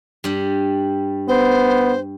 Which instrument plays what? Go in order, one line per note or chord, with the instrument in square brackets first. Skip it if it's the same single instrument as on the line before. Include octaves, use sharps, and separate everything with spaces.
[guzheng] G2 G3
[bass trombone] B3 [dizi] C5